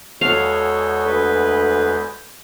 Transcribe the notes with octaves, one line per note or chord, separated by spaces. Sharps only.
E2 G#3 F#4 A4 C#5 F5 G6
D2 B4